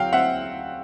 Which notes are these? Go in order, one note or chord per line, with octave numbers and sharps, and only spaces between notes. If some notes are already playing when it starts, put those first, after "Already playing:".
Already playing: F#3 C4 F5 G5
C4 E5 F#5